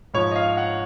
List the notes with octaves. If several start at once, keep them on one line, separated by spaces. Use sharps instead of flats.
G#2 F3 C#5
D#5
F5
F#5